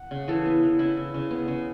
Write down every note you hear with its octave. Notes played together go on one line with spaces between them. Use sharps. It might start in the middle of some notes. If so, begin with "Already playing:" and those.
Already playing: F#5
C#3
E3 A4
B3
E3
C#3 E4
C#3
C#3
B3
C#3